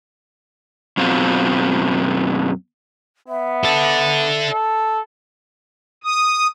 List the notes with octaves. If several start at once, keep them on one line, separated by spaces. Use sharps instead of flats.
F#2 B2 C4 F4
B3 E5
A4 D5
A4
D#6